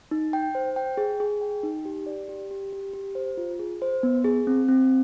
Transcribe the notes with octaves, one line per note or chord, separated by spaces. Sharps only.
D#4
G5
C5
G5
G#4
G#4
G5
D#4
G4
D5
G4
G4
G4
G4
C5
F4
G#4
C5
B3
G#4
C4
C4